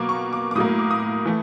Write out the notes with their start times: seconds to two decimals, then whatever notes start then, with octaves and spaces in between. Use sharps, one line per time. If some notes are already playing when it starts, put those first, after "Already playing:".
Already playing: B2 F#3 A#3 D6
0.09 C#6
0.33 D6
0.51 D6
0.55 A2 F#3 A#3 D#6
0.79 D6
0.91 D#6
1.25 E3 A3